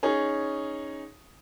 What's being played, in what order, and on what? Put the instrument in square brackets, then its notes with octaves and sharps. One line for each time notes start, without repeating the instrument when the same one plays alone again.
[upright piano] C#4 D#4 G#4 C#5